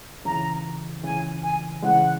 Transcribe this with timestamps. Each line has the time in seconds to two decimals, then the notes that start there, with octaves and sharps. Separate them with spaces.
0.25 C#2 C#3 E3 A#5
1.03 C#2 C#3 E3 G#5
1.42 G#5
1.83 C#3 E3 G#3 F#5